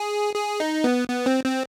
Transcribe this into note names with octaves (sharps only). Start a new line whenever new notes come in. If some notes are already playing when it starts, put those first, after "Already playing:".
Already playing: G#4
G#4
D#4
B3
B3
C4
C4